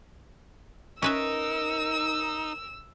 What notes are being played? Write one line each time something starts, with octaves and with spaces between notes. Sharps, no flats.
C#4 D#4 A#4 B4 E5 E6